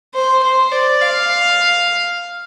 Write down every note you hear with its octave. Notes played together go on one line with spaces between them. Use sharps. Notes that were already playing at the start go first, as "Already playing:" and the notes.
C5
C5
D5
F5